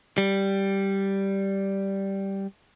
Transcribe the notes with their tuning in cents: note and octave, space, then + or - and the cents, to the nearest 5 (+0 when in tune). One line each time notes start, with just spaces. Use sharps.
G3 -5